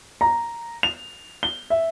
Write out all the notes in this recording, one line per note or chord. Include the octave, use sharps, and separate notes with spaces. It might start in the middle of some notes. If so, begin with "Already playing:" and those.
A#5
F7
G7
E5